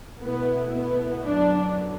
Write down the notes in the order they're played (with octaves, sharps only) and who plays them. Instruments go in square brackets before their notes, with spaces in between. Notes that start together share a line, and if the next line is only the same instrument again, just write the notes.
[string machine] B2 A3 E4 [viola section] B3
[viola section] B3
[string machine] F#2 D3 F#3 B3 [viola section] D4